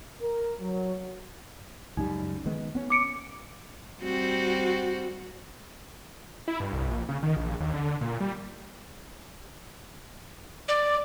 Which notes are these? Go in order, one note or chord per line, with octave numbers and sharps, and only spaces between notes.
A#4
F#3
C#2 F#2 G3 D#4
D#3 G#3 B3
B3 C#4
D6 C#7 D7
G3 C4 F#4
E4
G2
C2
A#1
C#3
D#3
A#1
D#2
D3
A#2
G3
D5